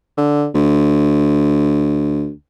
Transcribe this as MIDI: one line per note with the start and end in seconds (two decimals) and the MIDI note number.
0.17 0.46 50
0.54 2.31 38